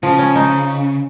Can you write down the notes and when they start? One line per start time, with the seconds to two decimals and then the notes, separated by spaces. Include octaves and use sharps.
0.03 C#3 F3
0.19 C#4
0.36 D#4